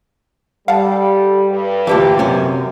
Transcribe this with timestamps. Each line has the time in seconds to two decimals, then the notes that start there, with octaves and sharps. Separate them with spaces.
0.68 G3 A4 F5 F#5 A5
1.50 G2
1.87 D2 A#2 D3 E3 G4
2.19 F#2 C3 C#4